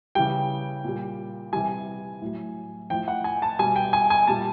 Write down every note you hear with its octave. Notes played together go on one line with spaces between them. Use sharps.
C#3 E3 G3 G5
A#2 G3
C3 E3 G3 G#5
A2 F#3
A2 F3 G5
F#5
G#5
A5
B2 G3 G#5
G5
G#5
G#5
A#2 G3 A5